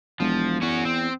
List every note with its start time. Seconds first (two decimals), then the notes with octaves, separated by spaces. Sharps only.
0.20 E1 F3
0.62 E2 C#4 F#4
0.85 C4